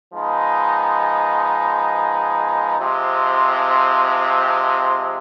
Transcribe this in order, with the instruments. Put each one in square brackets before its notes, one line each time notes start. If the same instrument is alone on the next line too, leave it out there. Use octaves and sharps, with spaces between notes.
[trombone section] F3 G#3 B3 D#4
C3 F3 G#3 C4